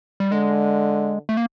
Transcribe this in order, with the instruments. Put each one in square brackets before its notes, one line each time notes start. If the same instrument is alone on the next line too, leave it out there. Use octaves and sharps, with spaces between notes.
[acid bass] G3
[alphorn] D3 [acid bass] G#3
[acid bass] A3
A#3